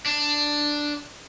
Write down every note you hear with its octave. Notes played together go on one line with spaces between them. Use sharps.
D4